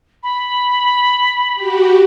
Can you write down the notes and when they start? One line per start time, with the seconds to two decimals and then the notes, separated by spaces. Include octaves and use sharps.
0.23 B5
1.54 F#4 G4